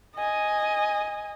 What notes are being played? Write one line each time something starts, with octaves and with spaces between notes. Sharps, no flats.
D#5 G#5